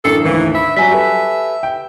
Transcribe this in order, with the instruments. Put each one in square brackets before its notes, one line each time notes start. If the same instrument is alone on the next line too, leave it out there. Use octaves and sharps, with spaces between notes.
[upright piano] A1 F#2 [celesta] D4 C7 C#7 [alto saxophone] A4
[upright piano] G#1 D2 [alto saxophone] E3
[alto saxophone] E5 [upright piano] B5
[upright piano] F#3 G3 [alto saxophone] E5 [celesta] G#5 B6
[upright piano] G4 A4 B4
G5